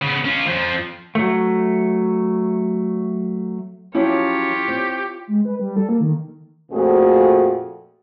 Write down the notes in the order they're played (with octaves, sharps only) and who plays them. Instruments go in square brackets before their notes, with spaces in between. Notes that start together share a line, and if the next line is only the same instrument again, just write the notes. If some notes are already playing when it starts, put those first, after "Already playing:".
[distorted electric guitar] C#3 B3
C#4 F4
F2 F3
[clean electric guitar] F#3 A3
[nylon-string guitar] F3 F#3 C#4 [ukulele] E4 [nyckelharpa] F4 C#5 [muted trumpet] G4
[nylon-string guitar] C4
[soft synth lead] G#3
B4
G3
A4
A#3
D#3
[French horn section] F2 A#2 F3 A3 F#4 G#4